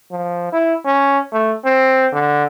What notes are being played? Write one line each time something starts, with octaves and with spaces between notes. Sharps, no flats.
F3
E4
C#4
A3
C4
D3